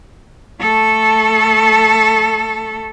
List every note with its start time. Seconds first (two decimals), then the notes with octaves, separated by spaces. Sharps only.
0.61 A3 A4